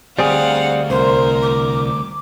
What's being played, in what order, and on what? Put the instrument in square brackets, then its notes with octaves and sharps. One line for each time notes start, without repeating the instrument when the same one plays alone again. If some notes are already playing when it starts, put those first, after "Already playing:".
[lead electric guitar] D2 [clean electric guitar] G3 C4 G#4 [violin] F5 F#5
[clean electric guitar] C2 [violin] A#4 [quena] C5
[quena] D6